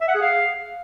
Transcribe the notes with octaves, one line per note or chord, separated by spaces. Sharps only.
E5
F#5
G#4
F5